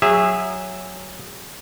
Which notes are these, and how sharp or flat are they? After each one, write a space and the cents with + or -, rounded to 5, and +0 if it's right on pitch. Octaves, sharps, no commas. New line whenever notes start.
F#3 +0 G#4 -25 E5 +0